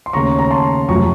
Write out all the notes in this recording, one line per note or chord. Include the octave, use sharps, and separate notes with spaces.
C6
D#2 C#3 A3 A#5 C#6
A#5
A5 C6
F1 F2 C3 F#3 A3 A#5 C#6